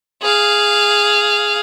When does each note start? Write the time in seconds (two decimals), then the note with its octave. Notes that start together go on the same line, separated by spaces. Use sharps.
0.22 G#4 F5